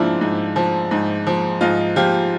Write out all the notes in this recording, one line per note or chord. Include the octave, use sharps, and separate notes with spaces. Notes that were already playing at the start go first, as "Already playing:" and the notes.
Already playing: G#2 F3 D4 E4 F4
G#2
F3
G#2
F3
G#2 D#4 F4
F3 F4 G4